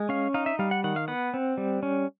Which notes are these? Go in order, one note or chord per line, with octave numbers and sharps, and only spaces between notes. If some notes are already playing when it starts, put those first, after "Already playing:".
Already playing: G#3
C#4 F5
D#4 F5
E5
G3 F5
F#5
D#3 F#5
F5
B3 F#5
C4
G3
C#4